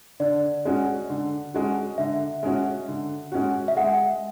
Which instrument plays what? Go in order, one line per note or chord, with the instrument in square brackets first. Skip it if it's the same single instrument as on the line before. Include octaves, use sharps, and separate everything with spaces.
[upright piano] D3 [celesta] D5
[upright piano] G#3 C#4 F#4
D3
G#3 C#4 F#4
[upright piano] D3 [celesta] E5
[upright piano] G#3 C#4 F#4
D3
G#3 C#4 F#4
[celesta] E5
[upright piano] G#3 [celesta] F#5